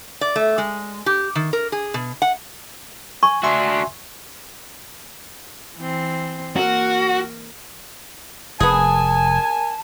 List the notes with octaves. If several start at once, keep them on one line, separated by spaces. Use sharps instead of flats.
D5
A3
G#3
G4
D#3
A#4
G#4
B2
F#5
G#5 C#6
D4 F#4 E5 G#5 C6
E3 C4
A#3 F#4 A#4
F1 B3 G#4 A#4 G#5 A5